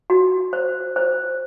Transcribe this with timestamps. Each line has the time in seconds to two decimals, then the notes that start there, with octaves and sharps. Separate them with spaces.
0.10 F#4
0.53 C5
0.96 C5